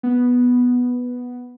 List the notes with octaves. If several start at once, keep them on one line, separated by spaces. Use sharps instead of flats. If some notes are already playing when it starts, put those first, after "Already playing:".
B3